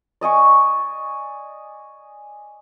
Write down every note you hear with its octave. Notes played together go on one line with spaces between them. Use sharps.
D5 D#5 G#5 C#6